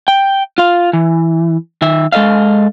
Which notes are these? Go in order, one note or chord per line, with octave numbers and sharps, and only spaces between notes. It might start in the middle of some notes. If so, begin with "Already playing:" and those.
G5
F4 F5
E3
D#3 E5
G#3 A4 D#5 F5